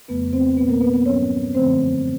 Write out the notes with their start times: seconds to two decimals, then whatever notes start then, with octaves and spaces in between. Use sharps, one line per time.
0.08 F2 C#3 F3 A3 B3 B4
0.32 C4 C5
0.57 B2 G3 B3 B4
0.69 A#3 A#4
0.81 B3 B4
0.94 B3 B4
1.05 G#2 D#3 F#3 A#3 C#4 C#5
1.54 F#2 D3 F3 A3 C4 C5